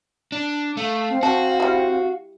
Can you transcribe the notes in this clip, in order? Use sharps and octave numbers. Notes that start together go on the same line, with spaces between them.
D4
A3 F5
C4
C4 F#4 A5
G3 E4